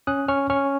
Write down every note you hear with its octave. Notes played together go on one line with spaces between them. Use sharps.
C#4 D#6 F#6
C#4 C#6 F6
C#4 C#6 F6